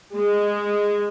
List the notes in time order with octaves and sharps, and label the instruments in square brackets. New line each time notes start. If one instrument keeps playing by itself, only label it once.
[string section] G#3